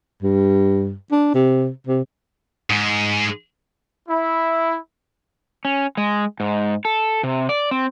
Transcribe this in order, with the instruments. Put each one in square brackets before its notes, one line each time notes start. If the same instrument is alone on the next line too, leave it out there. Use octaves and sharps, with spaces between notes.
[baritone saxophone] G2
D4
C3
C3
[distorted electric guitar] G#2 G#3
[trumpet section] E4
[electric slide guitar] C#4
G#3
G#2
A4
C3
D5
C4